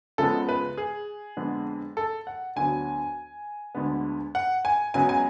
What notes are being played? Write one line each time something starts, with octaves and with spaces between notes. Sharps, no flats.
C#2 C#3 F3 G#3 B3 A4
B4
G#4
F2 D3 G#3 B3
A4
F#5
D2 D3 F#3 B3 G#5
D2 D3 G#3 B3
F#5
G#5
C#2 C#3 F#3 B3 G#5
G#5